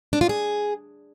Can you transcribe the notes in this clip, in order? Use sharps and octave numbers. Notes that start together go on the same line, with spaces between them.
D4
F4
G#4